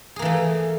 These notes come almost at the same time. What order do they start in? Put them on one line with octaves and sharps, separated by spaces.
G#4 A#3 E3 A3